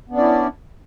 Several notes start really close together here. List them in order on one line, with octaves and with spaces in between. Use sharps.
B3 D4 C#4 D5 E4